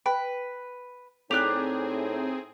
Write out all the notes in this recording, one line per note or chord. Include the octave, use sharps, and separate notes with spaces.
B4 G5
A2 C4 D#4 G4 G#4 D5 F#6 F7